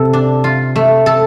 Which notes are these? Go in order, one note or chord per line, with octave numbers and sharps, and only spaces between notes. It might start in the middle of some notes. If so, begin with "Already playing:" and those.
Already playing: C3 A4
D4
F4
A3
A4